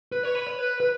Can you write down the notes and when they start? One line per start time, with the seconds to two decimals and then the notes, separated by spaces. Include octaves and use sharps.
0.12 B4
0.23 C#5
0.35 B4
0.47 C#5
0.59 B4
0.80 B4